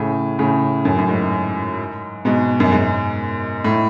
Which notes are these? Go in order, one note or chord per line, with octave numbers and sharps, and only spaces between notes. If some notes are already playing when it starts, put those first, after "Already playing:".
Already playing: A2 C#3
A2 C#3
F#2 A2
F#2
G#2
G#2 B2
F#2
G#2
A2